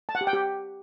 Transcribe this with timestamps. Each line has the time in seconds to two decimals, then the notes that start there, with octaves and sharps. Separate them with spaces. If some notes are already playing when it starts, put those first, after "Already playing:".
0.09 A5
0.15 F#5
0.21 G4
0.27 G5
0.33 G4